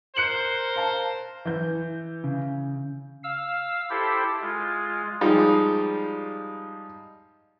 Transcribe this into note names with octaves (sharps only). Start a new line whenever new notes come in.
A#4 C5 F#6 C#7 F#7
F5 A5
E3 G6
C#3
F5 E6
E4 G4 A4 C5
G#3 F4
F3 G3 G#3 D#4 F4